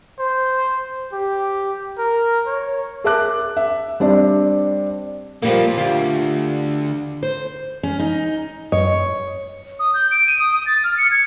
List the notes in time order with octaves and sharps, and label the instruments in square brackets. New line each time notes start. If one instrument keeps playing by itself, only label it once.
[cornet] C5
G4
A#4
C#5
[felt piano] G#4 A#4 E5 A5 D6 F#6
E5
G3 C4 D4
[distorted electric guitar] A#2 [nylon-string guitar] F3 G3 A#3
[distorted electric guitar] D2 [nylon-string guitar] F4 G4
[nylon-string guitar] C5
[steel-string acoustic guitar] C#4
D#4
[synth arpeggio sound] F#2 D#5 [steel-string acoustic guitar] C#5
[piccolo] D#6
G6
D7
D#7
D#6
D#6
A6
F6
C#7
G#6